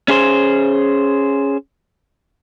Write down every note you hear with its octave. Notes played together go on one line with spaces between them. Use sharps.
C#4 G#4 C5